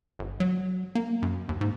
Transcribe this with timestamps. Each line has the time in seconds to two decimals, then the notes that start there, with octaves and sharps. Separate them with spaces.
0.19 G1
0.40 F#3
0.95 A#3
1.22 F#2
1.49 D#2
1.61 G#2